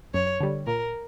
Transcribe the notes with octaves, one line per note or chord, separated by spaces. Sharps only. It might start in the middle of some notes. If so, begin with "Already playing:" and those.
F#2 C#5
D3 G3
A#2 A#4